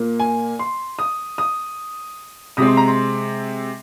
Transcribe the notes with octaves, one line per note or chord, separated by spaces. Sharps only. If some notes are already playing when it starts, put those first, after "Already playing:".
Already playing: A#2 A#3
G#5
C6
D#6
D#6
C3 G#3 C4 D#6
C6
A#5
C6